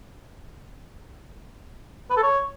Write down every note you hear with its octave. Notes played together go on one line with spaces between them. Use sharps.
B4
A4
C#5